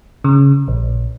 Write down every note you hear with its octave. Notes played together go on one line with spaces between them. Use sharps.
C#3
A#1